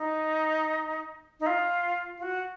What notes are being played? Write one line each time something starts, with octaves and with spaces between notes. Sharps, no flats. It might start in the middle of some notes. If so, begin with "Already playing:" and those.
Already playing: D#4
D#4
F4
F4
F#4